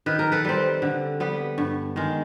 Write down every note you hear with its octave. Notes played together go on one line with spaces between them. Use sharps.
D#3 B4
A#4
A4 B4
G3 C4
D3
G3 B3
G2
D#3 G#3